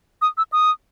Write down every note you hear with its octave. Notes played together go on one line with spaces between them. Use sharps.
D#6
E6
D#6